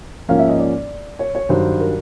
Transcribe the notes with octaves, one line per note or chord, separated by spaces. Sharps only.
G#2 F3 A#3 C#4 F5
E5
D#5
D5
C#5
C#5
G2 D#3 F#3 C5
A#4